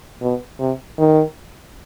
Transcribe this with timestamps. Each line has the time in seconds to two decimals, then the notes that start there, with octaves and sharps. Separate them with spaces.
0.22 B2
0.59 C3
0.98 D#3